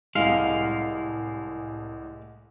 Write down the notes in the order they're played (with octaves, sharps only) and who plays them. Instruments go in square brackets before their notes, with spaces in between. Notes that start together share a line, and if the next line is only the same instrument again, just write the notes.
[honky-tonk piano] C2 A2 [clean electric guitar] G#3 F5